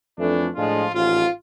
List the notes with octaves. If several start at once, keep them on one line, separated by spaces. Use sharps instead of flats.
F2 E3 A3 D4
A2 F3 G#3 D4 F4
A1 G#2 F3 F4